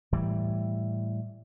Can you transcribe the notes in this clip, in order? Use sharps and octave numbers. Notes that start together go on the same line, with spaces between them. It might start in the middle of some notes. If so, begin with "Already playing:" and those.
A2 E3 G3